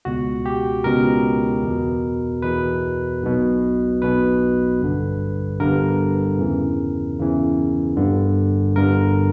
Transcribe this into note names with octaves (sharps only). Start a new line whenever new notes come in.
C#2 B2 F#4
G4
C#2 B2 A#4
E2 B2
E2 B2 B4
B1 B2
B1 B2 B4
G1 G2 D3
G1 G2 D3 A#4
E2 C#3 E3
E2 C#3 E3
G1 G2 D3
G1 G2 D3 A#4